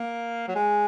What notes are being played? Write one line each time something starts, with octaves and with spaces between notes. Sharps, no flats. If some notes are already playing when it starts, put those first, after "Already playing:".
Already playing: A#3
F#3
G#3